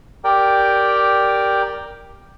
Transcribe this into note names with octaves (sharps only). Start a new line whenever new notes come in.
G4 A#4 D5 G5